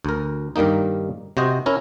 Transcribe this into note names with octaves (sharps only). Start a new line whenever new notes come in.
D2 A#4
G2 D#3 G3 A#3 D#4
C3 F#4 C5 D#5
C#4 E4 A#4